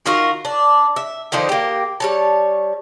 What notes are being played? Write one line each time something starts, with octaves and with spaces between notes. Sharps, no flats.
D#3 F4 F#4 A#4
D4
E5
D3 D#3 F3 C5
A#3 G4
G3 C#5 A5